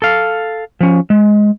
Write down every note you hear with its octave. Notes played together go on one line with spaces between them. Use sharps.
A4 F5
F3 C#4
G#3